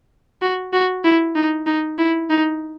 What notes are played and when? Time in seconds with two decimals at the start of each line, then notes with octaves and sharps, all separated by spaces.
0.42 F#4
0.73 F#4
1.04 E4
1.36 D#4
1.66 D#4
1.98 E4
2.30 D#4